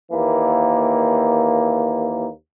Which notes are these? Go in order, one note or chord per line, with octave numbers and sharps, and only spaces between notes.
D#2 E3 A#3